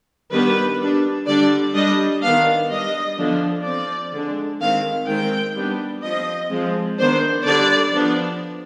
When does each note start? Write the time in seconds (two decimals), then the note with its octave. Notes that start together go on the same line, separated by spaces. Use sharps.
0.32 D#3 G3 B3 D4 B4
0.79 G3 B3 D4
1.27 D3 G3 D4 D5
1.74 G3 D4 D#5
2.22 D#3 B3 D4 F5
2.71 G3 D4 D#5
3.18 D3 F3 B3 D4
3.65 F3 C4 D5
4.13 D3 G#3 D4
4.60 D#3 G#3 C4 F5
5.08 D#3 G#3 C4 G5
5.56 G3 B3 D4
6.03 F3 C4 D#5
6.51 F3 G#3 C4
6.99 D#3 B3 D4 C5
7.46 D3 G3 D4 D5
7.94 F3 B3 D4